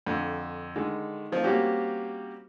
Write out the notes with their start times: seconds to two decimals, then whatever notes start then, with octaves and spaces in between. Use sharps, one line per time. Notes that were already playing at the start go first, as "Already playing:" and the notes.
0.07 F2 D3
0.76 D3 D#3 G#3
1.32 D#3 F3 C4
1.44 G3 A#3 C4 C#4 F#4 G4